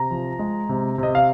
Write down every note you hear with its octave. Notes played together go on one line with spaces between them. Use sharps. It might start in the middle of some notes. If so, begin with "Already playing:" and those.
Already playing: C3 A#5
F3
G#3
C3
C3 D#5
F5